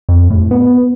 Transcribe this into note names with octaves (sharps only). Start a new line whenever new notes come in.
F2
A2
B3